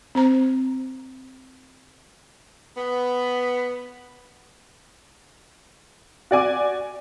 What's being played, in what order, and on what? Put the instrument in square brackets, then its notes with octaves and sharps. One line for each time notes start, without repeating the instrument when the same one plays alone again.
[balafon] C4 C5 A#5
[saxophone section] B3
[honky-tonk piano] F#4 D5 G#5 D6